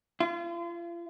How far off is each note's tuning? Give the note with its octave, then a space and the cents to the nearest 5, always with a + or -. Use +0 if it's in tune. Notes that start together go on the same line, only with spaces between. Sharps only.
F4 -35